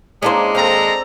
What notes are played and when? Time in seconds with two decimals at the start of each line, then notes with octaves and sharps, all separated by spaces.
0.23 G#3 A#3 C#4 D4 E4 C5 D#5
0.55 D#2 C4 A4 F5 A#5